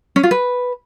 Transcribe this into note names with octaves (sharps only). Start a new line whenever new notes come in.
C#4
F4
B4